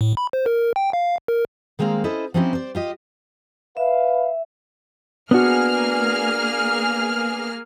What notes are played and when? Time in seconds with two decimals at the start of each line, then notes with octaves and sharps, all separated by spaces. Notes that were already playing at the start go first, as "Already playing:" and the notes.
0.01 A2
0.17 B5
0.33 C5
0.46 A#4
0.76 G5
0.93 F5
1.28 A#4
1.79 D#3 G#3 A#3 C4 F5
2.04 C#4 E4 A4 C5 D#5
2.34 F3 C4 C#4 D#4 E4 G4
2.53 C5 D5
2.75 F4 G4 D#5
3.77 B4 E5 F5
5.31 A#3 B3 D4 F#4 G#4 F6